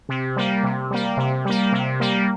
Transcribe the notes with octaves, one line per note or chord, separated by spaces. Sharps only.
C3
G3 A#3
C3
G3 A#3
C3
G3 A#3
C3
G3 A#3